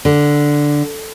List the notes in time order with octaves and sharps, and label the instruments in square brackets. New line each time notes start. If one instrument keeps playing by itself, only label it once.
[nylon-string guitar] D3